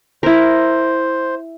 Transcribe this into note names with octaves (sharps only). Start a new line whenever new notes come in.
E4 A#4 C5